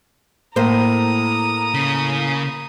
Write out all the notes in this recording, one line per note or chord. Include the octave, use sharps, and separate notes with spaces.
A2 A#3 C5 A#5 D#6
C#3